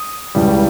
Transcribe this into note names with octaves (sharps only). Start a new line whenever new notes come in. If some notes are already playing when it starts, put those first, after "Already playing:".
Already playing: D#6
C#2 C#3 E3 G3